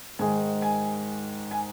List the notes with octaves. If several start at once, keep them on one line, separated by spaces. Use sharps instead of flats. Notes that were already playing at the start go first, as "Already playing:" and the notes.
G#2 D#3 G#3 G#5
G#5
G#5